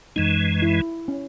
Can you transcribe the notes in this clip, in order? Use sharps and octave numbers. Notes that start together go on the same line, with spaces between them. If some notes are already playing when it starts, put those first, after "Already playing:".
F#2 E3 G#3 D#4
E4
C#4